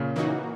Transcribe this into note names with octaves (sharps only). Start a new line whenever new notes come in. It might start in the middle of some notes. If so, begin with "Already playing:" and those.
Already playing: A#2 C#3
E3 A#3 D#4 F#4